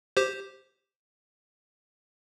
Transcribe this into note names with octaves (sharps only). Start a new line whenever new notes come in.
G4 C5